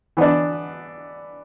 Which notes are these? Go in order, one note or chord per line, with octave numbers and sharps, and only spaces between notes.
E3 B3 D4